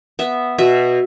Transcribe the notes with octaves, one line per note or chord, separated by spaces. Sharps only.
B3 E5
B2 E5